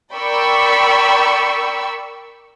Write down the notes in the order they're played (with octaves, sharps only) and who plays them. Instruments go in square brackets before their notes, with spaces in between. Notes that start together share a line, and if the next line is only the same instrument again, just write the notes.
[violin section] A#4 D5 G5 B5 C#6 E6